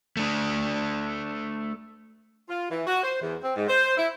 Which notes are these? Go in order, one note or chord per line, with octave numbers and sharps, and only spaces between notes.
A3 D4
F4
E3
F#4
C5
E2
C4
G#2
C5
E4